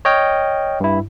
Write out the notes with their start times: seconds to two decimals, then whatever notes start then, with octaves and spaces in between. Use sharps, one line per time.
0.05 C#5 D#5 G5 F6
0.80 G2 E4